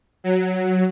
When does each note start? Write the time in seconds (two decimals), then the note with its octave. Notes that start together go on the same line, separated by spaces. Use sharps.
0.24 F#3